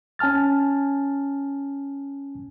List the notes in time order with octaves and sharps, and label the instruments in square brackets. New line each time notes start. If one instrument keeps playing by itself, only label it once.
[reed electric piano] C#4 G#5 A5 F6 A6